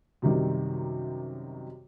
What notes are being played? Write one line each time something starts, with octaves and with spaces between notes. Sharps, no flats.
F#2 C3 D#3 G3